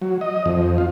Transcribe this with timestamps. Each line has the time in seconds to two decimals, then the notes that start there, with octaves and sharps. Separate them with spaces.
0.02 F#3
0.21 D#5
0.46 F2
0.78 F4